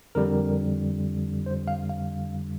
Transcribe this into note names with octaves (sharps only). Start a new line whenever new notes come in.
F2 D3 G3 A#4
C5
F5
F5